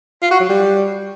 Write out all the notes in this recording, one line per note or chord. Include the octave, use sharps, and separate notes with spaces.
F4
F#4
F#3
G3